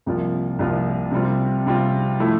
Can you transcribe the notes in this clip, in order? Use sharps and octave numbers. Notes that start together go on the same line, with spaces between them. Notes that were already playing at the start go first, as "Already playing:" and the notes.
C2 C3 F3 A#3 F4
C2 C3 F3 A#3 F4
C3 G3 C4 F4
C3 G3 C4 F4
F3 A3 E4